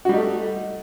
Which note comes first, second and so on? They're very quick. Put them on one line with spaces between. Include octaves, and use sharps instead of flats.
F#4 G3 D#4 A3